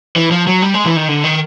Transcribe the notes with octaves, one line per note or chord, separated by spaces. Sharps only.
E3
F3
F#3
G3
G#3
E3
D#3
D3
D#3